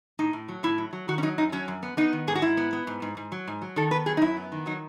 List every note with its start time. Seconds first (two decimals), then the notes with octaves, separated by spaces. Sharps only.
0.19 A2 D#4
0.33 A2
0.48 F#3
0.63 A2 E4
0.78 F#3
0.93 F#3
1.08 D#3 F#4
1.18 C#4
1.22 F#3 D#4
1.38 F#2 D#4
1.52 F#3 C#4
1.68 F#2
1.83 B3
1.97 B3 D#4
2.13 D#3
2.27 G#2 G#4
2.35 F#4
2.42 G#2 E4
2.57 B3
2.73 B3
2.87 G#2
3.02 G#2
3.17 G#2
3.32 F#3
3.48 G#2
3.62 F#3
3.76 D#3 A4
3.91 B3 B4
4.06 F#3 G#4
4.17 D#4
4.21 F#2 E4
4.37 B3
4.52 D#3
4.66 F#3 D#4